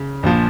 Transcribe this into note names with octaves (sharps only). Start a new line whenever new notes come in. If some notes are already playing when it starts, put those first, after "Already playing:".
Already playing: C#3
A#1 A#2 F3